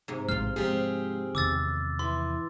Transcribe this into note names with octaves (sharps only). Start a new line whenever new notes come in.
G#2 C3
A#1 A2 G#3 F4 C5 F6
F3 G#3 C4 G4 G#4
E2 C3 D#3 D6 E6 A6
E3 C6